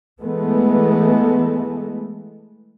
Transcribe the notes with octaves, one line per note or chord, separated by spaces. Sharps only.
E3 G#3 A3 B3